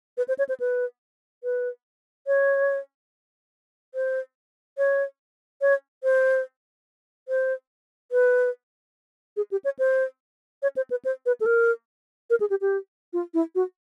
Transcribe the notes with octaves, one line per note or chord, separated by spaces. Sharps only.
B4
C5
C#5
C5
B4
B4
C#5
C5
C#5
C#5
C5
C5
B4
G#4
G4
C#5
C5
C#5
C5
B4
C5
B4
A4
A#4
A#4
G#4
G4
G4
F4
E4
F#4